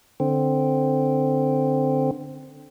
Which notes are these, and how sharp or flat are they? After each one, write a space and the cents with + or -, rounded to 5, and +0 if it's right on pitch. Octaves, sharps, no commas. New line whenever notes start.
D3 +0 C4 +0